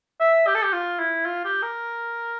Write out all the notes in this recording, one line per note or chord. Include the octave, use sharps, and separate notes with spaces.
E5
G4
A4
G4
F4
E4
F4
G4
A#4